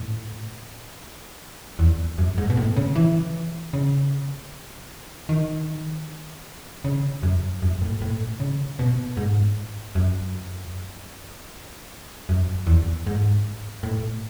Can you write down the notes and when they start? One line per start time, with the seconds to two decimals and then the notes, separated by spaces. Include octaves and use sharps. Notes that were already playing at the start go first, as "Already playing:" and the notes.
Already playing: A2
1.79 E2
2.18 F#2
2.38 G#2
2.50 B2
2.57 A2
2.76 C#3
2.95 E3
3.73 C#3
5.29 D#3
6.84 C#3
7.23 F#2
7.62 F#2
7.82 A2
8.02 A2
8.40 C#3
8.79 B2
9.17 G#2
9.95 F#2
12.29 F#2
12.67 E2
13.07 G#2
13.83 A2